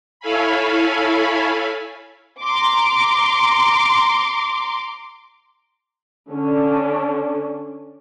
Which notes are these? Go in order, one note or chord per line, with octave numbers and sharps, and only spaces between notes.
E4 A4 C#5 F5 G#5 B5
A#5 C6 D6
D3 C#4 D4